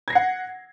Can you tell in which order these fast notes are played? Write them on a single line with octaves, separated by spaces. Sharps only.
G#6 A#6 C7 F#5